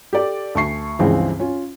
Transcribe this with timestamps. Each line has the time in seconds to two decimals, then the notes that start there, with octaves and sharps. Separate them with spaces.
0.13 G4 A4 D5
0.55 D2 A5 C#6 C7
0.99 C#2 G2 E3 F3 G#3 C4
1.40 C#4 F4